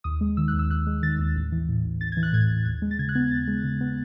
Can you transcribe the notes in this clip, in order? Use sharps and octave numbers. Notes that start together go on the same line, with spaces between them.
D#2 D#6
G#3
D#3 E6
F#6
D#2
E6
D#2 F#6
G#3
D#3 A6
D#2
A1
E3
A2
A1
A1 A6
E3 G#6
F#6
A2 G#6
A1
D#2 G#6
G#3
A6
C#3 G#6
F#6
B3 G#6
D#2 A6
G#3
C#3
B3